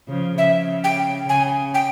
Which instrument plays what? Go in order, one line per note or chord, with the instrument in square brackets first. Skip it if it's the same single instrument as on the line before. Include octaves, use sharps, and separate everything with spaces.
[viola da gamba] C#3 F3
[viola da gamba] C#3 [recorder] E5
[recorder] G5
[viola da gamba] C#3 [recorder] G#5
[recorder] G5